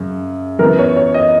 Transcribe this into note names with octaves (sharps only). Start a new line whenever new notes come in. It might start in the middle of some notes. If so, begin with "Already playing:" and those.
Already playing: F#2 C#3
F#2 E3 B3 A#4
C#5
C#5
D#5